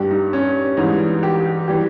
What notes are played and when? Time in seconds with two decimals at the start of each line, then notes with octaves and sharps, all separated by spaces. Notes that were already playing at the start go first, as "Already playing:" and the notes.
Already playing: G2 G3 G4
0.11 D#4
0.33 C#4
0.77 G#2 E3 G3 D#4
1.23 G4
1.68 E3 G3 G4